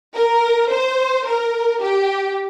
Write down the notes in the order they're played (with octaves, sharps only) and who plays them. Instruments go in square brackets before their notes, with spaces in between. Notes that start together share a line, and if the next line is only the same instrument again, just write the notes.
[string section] A#4
C5
A#4
G4